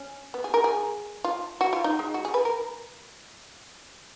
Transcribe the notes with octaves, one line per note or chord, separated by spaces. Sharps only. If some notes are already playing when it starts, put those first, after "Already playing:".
Already playing: C#4
B3
G#4
A#4
G#4
F4
F#4
F4
D#4
G#3
F#4
G#4
B4
A#4